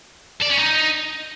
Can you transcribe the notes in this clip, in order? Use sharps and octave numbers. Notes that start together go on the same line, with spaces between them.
D5
C#4
D#4